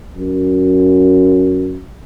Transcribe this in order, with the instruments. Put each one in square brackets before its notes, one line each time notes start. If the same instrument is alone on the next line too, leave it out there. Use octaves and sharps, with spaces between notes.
[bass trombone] F#2